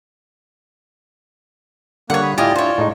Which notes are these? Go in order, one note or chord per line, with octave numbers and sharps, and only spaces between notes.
D3 G3 A#3 C#5 F#5 F#6
B5 D#6
A2 E4 F4 G4 D5 D#5 F5 G#5
D4 E4 C5 C#5
A2 G#3 D#4